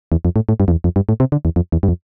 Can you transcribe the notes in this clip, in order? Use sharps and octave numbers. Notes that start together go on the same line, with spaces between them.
E2
F2
A2
A2
G2
F2
E2
F2
G2
A2
C3
D3
E2
F2
E2
G2
F2